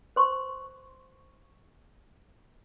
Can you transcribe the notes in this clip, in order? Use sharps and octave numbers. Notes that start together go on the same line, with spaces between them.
C5 C6 C#6